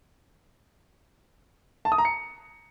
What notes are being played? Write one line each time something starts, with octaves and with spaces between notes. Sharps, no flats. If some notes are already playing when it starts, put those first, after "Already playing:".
A5
D#6
A#5
C#7